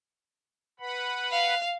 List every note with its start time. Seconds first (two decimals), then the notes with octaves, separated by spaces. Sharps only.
0.80 B4 F#5 B5
1.32 F5